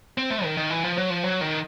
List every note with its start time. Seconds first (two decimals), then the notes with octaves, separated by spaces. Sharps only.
0.18 C4
0.30 A3
0.44 D#3
0.57 D#3
0.70 E3
0.84 F3
0.98 F#3
1.10 F3
1.24 F#3
1.41 D#3